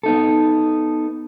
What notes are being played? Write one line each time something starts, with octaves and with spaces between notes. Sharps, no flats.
B3 D#4 A4